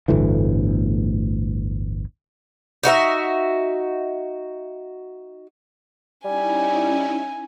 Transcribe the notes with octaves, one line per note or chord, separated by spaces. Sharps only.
G1 D2 A2 E3
D#4 F#4 A#4 E5
G3 C#4 D#4 E4 G#5